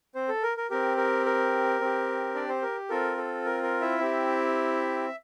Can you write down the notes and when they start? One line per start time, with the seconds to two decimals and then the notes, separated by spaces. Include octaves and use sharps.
0.15 C4 C5
0.29 A4
0.43 A#4
0.57 A#4
0.70 C4 G4 A#4
0.97 A#4
1.26 A#4
1.81 C4 G4
2.34 D4 D5
2.49 C4 C5
2.62 A#4
2.90 C4 F4 A4 A#4
3.17 A4
3.45 A#4
3.63 A#4
3.81 E4 E5
3.99 C4 G4